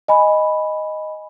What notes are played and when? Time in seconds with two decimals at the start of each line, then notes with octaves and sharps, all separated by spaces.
0.08 D#5 G#5 B5